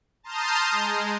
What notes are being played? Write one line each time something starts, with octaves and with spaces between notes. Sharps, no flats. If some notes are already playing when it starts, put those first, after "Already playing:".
A5 A#5 C6 D#6 F6 G6
G#3